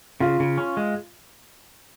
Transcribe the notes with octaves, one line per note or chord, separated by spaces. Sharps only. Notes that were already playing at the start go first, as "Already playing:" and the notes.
C#3 F4
C#3
C#4
G#3